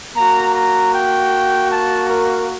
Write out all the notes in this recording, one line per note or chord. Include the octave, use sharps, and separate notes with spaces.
A#3 A#5
F#4
A#5
G5
A5
A#4